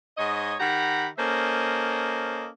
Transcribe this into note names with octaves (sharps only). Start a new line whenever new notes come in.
G#2 C#5 D#5
D#3 G4 F#5 A#5 B5
A#3 C#4 A4 C5 D#5